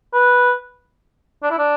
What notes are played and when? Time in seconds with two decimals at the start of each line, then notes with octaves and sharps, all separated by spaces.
0.14 B4
1.43 D4
1.50 E4
1.58 D4